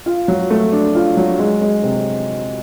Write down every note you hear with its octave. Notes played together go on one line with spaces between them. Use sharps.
F4
F#3
A3
D4
F4
F#3
G#3
G#3
C3